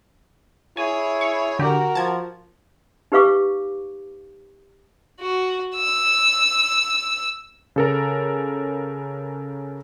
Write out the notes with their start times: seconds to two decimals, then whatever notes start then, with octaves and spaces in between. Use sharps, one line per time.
0.77 E4 G#4 C#5 G#5
1.21 C#6
1.59 D3 F#4 G4 A#4
1.95 F3 A5 G#6
3.12 D#4 G4 B4 F5 C#6 D6
5.20 F#4
5.76 E6
7.76 C#3 A4 A#4